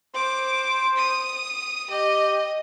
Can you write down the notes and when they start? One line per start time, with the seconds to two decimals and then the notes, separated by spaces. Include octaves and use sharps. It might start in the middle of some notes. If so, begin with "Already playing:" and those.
0.15 C5 D6
0.97 D#6
1.90 G4 D#5